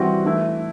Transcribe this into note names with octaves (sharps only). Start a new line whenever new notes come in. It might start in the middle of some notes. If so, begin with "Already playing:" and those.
Already playing: E3 G3 C4 F#4
E3 A3 E4